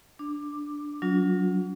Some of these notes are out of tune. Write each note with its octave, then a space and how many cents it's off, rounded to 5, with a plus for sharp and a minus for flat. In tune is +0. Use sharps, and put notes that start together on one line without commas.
D4 +0 D6 +10
F#3 +0 C#4 +45 F4 +35